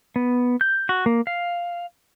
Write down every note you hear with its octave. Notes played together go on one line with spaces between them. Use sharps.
B3
G6
F#4
A#3
F5